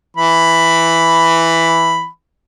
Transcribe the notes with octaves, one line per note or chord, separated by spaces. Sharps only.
E3 B5